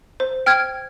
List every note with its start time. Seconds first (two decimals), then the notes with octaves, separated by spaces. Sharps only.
0.20 C5
0.46 G5 F6 G#6